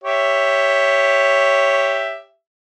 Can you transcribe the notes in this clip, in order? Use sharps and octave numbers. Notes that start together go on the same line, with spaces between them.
G4 C#5 E5